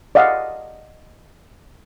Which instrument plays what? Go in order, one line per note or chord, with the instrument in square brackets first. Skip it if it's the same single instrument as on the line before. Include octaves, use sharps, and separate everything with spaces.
[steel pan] D5 D#5 F5 F#5